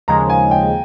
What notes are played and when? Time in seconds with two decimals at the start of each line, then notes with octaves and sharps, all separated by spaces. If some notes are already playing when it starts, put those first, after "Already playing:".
0.08 D#2 C#3 F3 G#3 A#5
0.30 G#5
0.51 G5